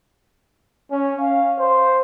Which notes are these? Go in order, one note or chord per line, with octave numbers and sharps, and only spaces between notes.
C#4
F5
C5